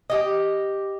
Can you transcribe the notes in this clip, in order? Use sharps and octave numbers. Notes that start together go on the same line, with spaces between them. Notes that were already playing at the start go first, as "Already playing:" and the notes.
G4 D#5